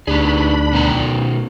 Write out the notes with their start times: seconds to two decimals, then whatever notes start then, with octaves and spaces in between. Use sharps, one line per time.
0.07 D2 D4 D#4 G4 G#4 B5
0.73 B2 D#3 A#5